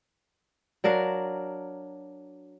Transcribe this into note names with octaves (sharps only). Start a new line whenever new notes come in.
F#3 D4 A#4 F5